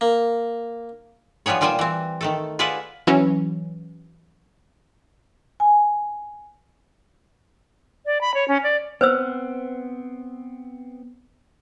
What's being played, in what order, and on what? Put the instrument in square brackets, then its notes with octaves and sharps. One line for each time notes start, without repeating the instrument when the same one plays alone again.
[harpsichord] A#3
[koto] F3 G3 B3 G#4 C#5
A#2 G3 F4 C5 G5 G#5
E3 C4
D#3 A3 A4
F4 G#4 B4 D5 E5 F#5
[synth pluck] E3 F#3 C#4
[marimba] G#5
[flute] D5
B5
C#5
C#4
D5
[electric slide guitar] B3 C4 [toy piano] B4 C5 E6